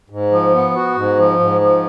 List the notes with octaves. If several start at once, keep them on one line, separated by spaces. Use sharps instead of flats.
G#2
F3
B3
F#4
G#2
F3
G#2
F3